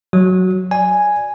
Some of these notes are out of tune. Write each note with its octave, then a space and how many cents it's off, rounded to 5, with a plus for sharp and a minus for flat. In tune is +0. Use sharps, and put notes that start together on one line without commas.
F#3 +0 F#4 +0
D5 +0 G#5 +0